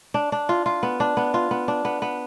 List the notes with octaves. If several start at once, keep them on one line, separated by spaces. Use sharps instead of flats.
D4
D4
F4
F4
B3
D4
B3
F4
B3
D4
B3
B3